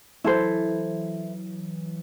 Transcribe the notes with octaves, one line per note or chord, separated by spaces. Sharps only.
E3 F#3 E4 A4 C5